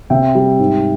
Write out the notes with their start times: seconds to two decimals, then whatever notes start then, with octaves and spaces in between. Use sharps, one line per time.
0.10 C3 E5 G5
0.35 G3
0.59 G#2